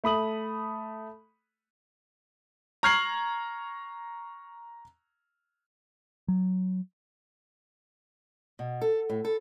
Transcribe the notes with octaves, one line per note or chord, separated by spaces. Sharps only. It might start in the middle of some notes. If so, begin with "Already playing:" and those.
A3 B5 D#6 F#7
A#5 C#6 F6 G#6 C7 F#7
F#3
B2
A4
A2
A4